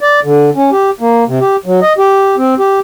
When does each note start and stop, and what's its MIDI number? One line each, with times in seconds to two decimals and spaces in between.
0.01 0.20 74
0.24 0.50 50
0.56 0.70 61
0.72 0.90 67
1.00 1.24 58
1.28 1.39 48
1.41 1.56 67
1.66 1.80 54
1.82 1.93 75
1.98 2.36 67
2.37 2.55 60
2.59 2.80 67